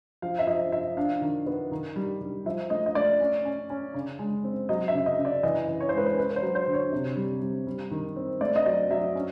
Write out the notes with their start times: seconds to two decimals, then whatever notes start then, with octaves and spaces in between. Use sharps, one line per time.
0.22 F3 F5
0.39 E5
0.47 F3 D#5
0.72 F3 E5
0.97 D4 F5
1.22 D#3
1.46 B3
1.71 D#3
1.96 G3
2.21 G3
2.46 F3 E5
2.70 A3 D#5
2.86 D#5
2.95 A3 D5
3.20 C#4
3.45 C#4
3.70 C#4
3.94 C#3
4.19 G#3
4.44 C4
4.69 F#3 D#5
4.88 E5
4.94 C#3
5.06 D#5
5.19 C#3
5.25 D5
5.43 E3 D#5
5.68 E3
5.80 C#5
5.89 C5
5.93 G#3 B4
6.06 C5
6.18 C#4 B4
6.31 B4
6.36 C5
6.42 F#3
6.55 C5
6.67 D3
6.74 C#5
6.92 C3
7.16 G3
7.42 G3
7.67 G3
7.91 D#3
8.16 C4
8.41 A3 D5
8.56 D#5
8.66 F#3 D5
8.90 F#3 E5
9.16 C#4